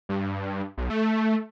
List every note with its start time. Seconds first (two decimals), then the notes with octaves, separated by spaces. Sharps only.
0.09 G2
0.77 B1
0.90 A3